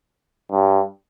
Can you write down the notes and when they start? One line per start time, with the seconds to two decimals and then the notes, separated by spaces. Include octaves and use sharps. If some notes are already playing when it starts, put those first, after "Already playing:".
0.51 G2